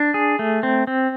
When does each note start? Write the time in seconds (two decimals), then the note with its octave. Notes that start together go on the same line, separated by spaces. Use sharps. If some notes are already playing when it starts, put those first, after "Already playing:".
Already playing: D4
0.14 G#4
0.39 A3
0.63 C4
0.87 C4